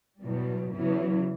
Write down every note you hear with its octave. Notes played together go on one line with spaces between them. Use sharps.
E2 B2 F#3 G3
E2 C#3 E3 F#3